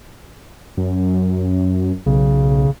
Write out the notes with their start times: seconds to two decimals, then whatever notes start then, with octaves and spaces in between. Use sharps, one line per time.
0.77 F#2
2.06 B1 C#3